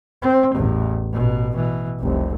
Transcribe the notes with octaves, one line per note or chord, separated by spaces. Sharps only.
C4
A1 E2
A1 B2
B2 E3
F1 C2